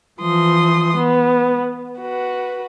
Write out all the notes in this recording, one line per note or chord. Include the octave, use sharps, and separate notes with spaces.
E3 F3 C6 D#6
B3
F#4 B4